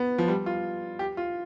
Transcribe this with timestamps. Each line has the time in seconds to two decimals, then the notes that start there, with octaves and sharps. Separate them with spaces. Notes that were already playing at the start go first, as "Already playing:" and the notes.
Already playing: B3
0.18 F3
0.28 G3
0.46 F4
0.99 G4
1.17 F4